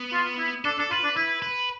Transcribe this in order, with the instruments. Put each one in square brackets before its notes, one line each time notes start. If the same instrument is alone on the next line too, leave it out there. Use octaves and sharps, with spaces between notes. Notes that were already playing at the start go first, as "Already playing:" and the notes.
Already playing: [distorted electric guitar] B3
[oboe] F4
E4
[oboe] D4 [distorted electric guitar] A4
[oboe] D4 [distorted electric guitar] A4
[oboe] F4 [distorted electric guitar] B4
[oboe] D4
[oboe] E4 [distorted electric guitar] B4
[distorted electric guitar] B4